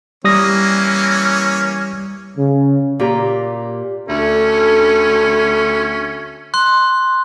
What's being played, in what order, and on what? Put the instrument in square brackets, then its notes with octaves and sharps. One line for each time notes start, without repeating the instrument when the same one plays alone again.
[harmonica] E3 A#3 C#4 [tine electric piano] G3 D#6 A#6
[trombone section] C#3
[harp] A#2 G4 A#5
[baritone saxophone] D2 [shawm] C#4 [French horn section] A4 [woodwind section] E5
[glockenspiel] C6 F#6